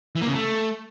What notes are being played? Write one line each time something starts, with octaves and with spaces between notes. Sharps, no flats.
E3
A#3
C#3
A3